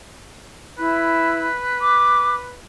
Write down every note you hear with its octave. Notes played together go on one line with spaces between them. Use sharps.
E4 B4
D6